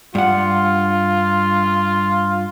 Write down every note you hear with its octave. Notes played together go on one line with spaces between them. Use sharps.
G2 F4 F#5